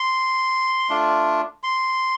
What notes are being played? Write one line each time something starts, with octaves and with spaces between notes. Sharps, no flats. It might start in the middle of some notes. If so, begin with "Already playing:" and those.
Already playing: C6
A3 D4 F4
C6